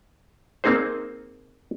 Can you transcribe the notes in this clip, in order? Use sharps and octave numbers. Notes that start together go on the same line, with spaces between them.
A#3 C4 D#4 G#4 C5